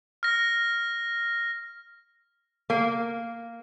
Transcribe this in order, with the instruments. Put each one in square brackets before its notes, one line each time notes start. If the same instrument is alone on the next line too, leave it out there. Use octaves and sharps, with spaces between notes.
[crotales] F6 A#6
[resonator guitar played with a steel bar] A#3